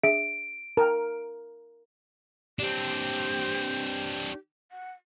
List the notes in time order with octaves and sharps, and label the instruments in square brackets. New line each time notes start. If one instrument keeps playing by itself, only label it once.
[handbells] D4 G#4 E5 [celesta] D7
[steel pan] A#4 [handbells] G5 A5
[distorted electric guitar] C4 D4 [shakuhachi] G4
[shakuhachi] F#5